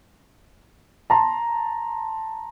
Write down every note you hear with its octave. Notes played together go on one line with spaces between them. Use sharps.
A5 A#5 C6